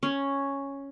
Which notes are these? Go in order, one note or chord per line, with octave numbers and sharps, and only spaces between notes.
C#4